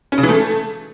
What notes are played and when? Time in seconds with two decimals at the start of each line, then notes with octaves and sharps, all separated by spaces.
0.12 C#4
0.18 C#3
0.23 E3
0.29 A3